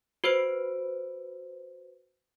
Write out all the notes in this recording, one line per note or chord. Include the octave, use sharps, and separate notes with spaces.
F#4 B4 C5 D7